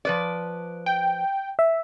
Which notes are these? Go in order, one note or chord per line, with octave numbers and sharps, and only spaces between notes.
F3 B4 D5
G5
E5